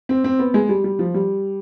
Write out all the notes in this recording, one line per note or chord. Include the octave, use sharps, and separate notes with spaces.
C4
C4
B3
G#3
G3
G3
F3
G3